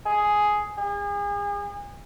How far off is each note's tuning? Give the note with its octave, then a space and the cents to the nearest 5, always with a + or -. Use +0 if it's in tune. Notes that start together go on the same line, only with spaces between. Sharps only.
G#4 +5
G#4 -35